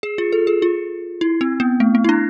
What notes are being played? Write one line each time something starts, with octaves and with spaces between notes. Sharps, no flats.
G#4
F4
A4
G#4
F4
E4
C4
B3
A3
A3
E4
D4